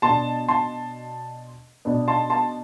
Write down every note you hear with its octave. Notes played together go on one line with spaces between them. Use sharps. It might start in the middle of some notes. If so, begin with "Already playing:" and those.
B2 B3 D4 A5 C6
A5 C6
B2 B3 D4
A5 C6
A5 C6